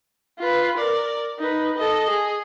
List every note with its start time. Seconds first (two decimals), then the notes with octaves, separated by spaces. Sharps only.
0.38 F4 B4
0.78 A#4 D5
1.39 D#4 B4
1.77 A4 D#5
2.10 G#4